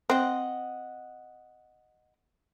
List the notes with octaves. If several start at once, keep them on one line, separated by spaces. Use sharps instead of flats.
C4 D#5 F#5